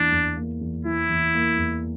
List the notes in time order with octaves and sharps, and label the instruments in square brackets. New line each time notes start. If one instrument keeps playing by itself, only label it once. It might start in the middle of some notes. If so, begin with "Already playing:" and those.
Already playing: [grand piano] E2 E3 A#3 [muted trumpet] D4
[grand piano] E2
A#3
E2
[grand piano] E3 [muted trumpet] E4
[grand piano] E2
A#3
E2